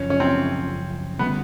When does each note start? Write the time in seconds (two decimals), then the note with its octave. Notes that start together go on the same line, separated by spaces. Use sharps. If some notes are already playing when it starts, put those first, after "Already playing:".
Already playing: F#2 C#3 F3 C#4
0.10 C#4
0.20 C4
1.19 D3 G3 A#3 B3 C#4